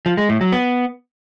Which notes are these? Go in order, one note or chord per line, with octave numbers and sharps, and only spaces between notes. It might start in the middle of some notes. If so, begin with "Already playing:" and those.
F3
G#3
A2
F#3
B3